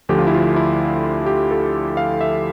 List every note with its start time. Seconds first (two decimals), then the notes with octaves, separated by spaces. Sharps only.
0.09 D2 D3 F3 G4
0.18 F4
0.27 E4
0.34 F4
0.56 E4
1.26 G4
1.51 A4
1.97 F5
2.21 E5